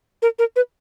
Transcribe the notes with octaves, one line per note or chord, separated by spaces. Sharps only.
A#4
A#4
B4